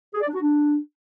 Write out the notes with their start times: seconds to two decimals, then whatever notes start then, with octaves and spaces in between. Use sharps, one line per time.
0.14 G#4
0.21 D5
0.27 D4
0.34 F#4
0.41 D4